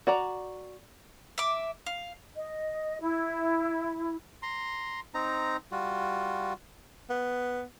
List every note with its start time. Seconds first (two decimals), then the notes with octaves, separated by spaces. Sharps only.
0.07 F#4 D5 A#5
1.38 E5 D6
1.86 F5
2.35 D#5
3.01 E4
4.43 A#5 C6
5.14 C4 D#4 A#5
5.72 G3 F4 F#4
7.10 B3